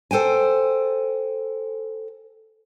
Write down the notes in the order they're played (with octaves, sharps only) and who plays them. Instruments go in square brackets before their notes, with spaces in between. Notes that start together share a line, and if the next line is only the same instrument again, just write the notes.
[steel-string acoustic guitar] A4 C5 G5 G#5